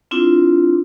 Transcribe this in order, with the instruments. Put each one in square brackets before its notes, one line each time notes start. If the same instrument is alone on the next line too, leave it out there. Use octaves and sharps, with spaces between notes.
[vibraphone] C4 D4 E4 F4